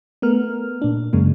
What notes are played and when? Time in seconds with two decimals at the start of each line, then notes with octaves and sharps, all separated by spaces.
0.22 A3 B3 A#4 F6
0.82 A#2 D4
1.13 F#2 C#3 G#3 A#3